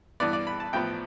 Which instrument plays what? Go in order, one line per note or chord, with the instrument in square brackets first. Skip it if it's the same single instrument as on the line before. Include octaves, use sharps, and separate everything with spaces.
[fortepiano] G2 E3 B3 D5
D5
B5
A5
A1 A2 F3 B3 G5